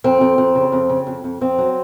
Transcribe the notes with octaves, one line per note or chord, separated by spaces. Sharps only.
F2 C4
F2
F2
C#3
F2
C#3
F2
F2
F2 C4
F#3